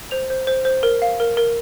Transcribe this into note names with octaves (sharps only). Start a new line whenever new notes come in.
C5 F7
C5
C5
C5
A#4
F5
A#4
A#4